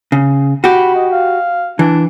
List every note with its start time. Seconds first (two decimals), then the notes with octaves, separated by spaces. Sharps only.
0.12 C#3
0.64 F#4 G4 B5
0.95 D#5
1.12 F5
1.79 E3 D4